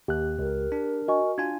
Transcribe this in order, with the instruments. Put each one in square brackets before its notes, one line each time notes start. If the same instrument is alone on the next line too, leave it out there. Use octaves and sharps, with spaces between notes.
[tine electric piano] D#2 [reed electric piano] G4 F#6
[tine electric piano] C#2 [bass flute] A#4
[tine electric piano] D4
[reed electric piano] F#4 [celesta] D#5 G#5 C#6
[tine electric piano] D4 F4 G#5 [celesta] G#6